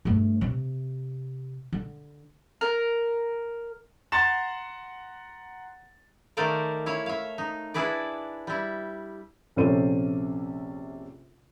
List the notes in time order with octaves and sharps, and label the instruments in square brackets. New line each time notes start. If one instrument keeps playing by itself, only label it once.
[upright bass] G2 A3
C3
D3
[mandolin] A#4
[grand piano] F#5 A#5 C6 A6 E7
[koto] D#3 A3 A#4 C5 D5 F5
E4 C#5 F5
E5 F5
D#4
D4 E4 G#4 B4 D5
G3 E4
[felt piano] A#1 C3 C#4 A4 C5 D#7